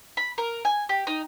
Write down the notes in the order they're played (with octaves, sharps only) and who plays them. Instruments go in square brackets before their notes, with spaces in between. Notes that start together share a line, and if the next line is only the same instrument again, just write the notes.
[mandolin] B5
A#4
G#5
G4
D#4